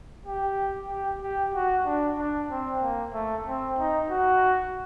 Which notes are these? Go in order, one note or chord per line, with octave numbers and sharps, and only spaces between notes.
G4
G4
G4
F#4
D4
D4
C4
A#3
A3
C4
D#4
F#4